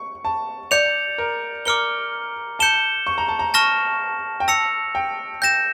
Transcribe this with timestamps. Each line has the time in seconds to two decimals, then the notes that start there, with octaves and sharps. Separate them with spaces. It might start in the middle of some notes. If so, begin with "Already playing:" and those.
Already playing: C#6
0.25 A5
0.71 D5 G6 C#7 F7
1.18 A#4
1.65 A#4 D6 F6 C#7 G7
2.59 A5 G6 C#7 E7 G7
3.07 C#6
3.18 A#5
3.28 A5
3.39 A#5
3.54 A5 C#6 F6 A#6 E7
4.40 G5
4.48 A5 E6 A#6 C#7 F7
4.95 G5
5.42 G5 G6 A#6 E7